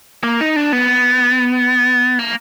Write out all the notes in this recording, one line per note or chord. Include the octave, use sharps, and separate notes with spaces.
A#3
D#4
D4
B3
A#3